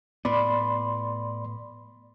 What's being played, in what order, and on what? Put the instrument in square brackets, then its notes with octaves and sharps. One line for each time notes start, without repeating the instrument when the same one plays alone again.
[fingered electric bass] A2 B3 [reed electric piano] D5 B5 C6